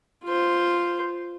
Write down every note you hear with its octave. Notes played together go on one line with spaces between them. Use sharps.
F4 C5